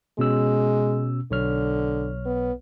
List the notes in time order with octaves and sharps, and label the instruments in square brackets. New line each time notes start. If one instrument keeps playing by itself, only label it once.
[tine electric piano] B2 C#4 E6 [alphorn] G#3
[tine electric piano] B1 C#5 F6 [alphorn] D3
[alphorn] B3